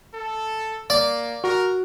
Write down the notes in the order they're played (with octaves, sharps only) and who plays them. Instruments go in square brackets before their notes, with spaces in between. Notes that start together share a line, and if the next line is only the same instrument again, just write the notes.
[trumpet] A4
[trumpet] A#3 [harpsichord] D5
[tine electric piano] F#4 [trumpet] A#4